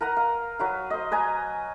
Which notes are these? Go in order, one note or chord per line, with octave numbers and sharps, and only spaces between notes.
A#4 B4 F#5 A#5
F5
F#3 B4 F5
C5 D#5
B4 D#5 G#5 A#5